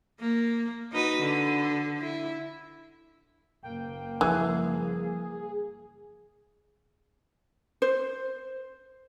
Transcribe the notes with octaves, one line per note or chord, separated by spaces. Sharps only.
A#3
D#4 F#4 B4
D3
E4
F#1 A#3 G5
E3 F3 G3 G#4
C5